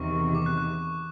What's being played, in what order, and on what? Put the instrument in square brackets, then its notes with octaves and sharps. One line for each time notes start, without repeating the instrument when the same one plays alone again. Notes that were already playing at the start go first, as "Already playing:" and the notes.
Already playing: [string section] E2 C3 D#3 [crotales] C#6
[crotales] D6
F#6
F#6